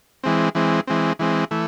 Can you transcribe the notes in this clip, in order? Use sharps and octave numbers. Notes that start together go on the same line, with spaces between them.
E3 G#3 C4
E3 G#3 C4
E3 G#3 C4
E3 G#3 C4
E3 A3